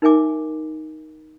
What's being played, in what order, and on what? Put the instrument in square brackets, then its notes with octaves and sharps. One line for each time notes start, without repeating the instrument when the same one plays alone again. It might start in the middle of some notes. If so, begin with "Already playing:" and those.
[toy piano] D#4 A#4 E5 G#5 D6